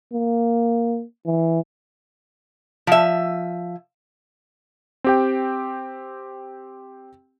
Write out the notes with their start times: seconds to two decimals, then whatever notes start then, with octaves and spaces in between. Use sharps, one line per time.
0.13 A#3
1.26 E3
2.87 F3 E5
5.04 C4 G4 G5